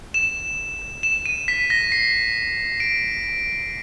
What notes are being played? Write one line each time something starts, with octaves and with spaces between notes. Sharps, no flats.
E7
E7
D#7
B6
A#6
C7
D7